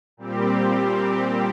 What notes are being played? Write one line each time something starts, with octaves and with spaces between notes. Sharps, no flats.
A#2 G3 C4 G4